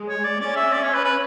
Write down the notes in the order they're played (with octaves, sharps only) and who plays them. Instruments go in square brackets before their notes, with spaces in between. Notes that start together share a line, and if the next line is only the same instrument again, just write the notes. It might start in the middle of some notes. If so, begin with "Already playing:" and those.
Already playing: [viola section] G#3
[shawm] C#5
D5
[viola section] C#4 [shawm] D5
[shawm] E5
D5
C#5
B4
B4